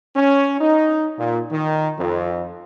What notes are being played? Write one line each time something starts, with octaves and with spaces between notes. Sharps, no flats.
C#4
D#4
A#2
D#3
F2